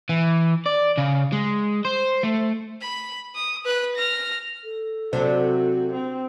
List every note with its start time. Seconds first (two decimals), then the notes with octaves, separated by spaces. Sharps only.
0.09 E3
0.66 D5
0.98 C#3
1.33 G#3
1.85 C5
2.23 A3
2.81 B5
3.35 D#6
3.65 B4 F#6
3.95 F6 A#6
4.64 A4
5.13 C3 F#3 D4 F#4 C5
5.94 C4